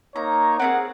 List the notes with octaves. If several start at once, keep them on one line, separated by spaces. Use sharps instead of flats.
A#3 D#4 C#5 A#5
C4 E4 G#4 A#4 F#5